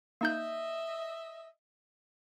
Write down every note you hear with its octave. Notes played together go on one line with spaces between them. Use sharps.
A#3 D#4 D#5 E5 G6